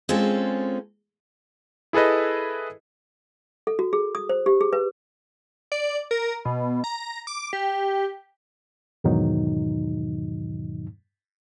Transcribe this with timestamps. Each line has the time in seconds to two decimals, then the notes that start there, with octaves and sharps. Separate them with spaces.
0.09 G#3 C4 C#4 F4 A4
1.93 E4 G#4 A4 B4 D#5
3.67 A4
3.79 F#4
3.93 G#4
4.15 D#6
4.29 C5
4.46 G4
4.61 G#4
4.73 B4
5.72 D5
6.11 A#4
6.45 B2
6.84 A#5
7.27 D6
7.53 G4
9.04 E2 G#2 B2 D#3 F#3 D#4